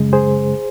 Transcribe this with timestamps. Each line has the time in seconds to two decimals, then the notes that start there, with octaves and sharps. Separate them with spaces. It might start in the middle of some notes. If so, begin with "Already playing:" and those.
Already playing: F#2 C#3 G#3
0.13 G#4 C5